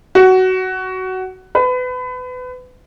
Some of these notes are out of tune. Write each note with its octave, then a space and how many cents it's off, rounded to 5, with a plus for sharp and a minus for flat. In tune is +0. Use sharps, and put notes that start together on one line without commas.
F#4 +15
B4 +30